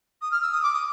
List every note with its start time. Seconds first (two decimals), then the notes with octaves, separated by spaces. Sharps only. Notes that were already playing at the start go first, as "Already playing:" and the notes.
0.22 D#6
0.31 F6
0.42 E6
0.52 D#6
0.62 D6
0.73 D#6